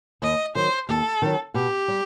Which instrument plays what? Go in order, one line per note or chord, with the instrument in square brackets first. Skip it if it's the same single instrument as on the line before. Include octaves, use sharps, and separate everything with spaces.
[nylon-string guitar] D#2 [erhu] D#5
[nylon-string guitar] D#3 F#3 [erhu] C5
[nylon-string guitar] D#2 [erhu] A4
[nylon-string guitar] D#3 F#3
[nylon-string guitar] B2 [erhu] G4
[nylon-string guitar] G3